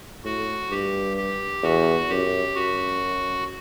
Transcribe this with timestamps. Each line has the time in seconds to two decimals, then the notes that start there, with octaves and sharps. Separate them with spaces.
0.25 A2 F#4
0.71 G2 G4
1.17 G4
1.63 E2 F#4
2.10 F#2 G4
2.55 F#2 F#4